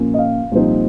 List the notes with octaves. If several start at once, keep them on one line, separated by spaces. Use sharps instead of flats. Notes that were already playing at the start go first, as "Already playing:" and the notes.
Already playing: A#2 F3 A#3 C#4
D#5
F5
C2 A#2 F3 C4 D#4